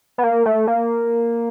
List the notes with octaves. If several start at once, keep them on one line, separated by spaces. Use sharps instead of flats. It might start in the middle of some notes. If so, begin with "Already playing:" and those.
B3
A#3
A3
A#3